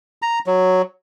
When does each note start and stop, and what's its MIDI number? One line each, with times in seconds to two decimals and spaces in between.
0.22 0.39 82
0.47 0.82 54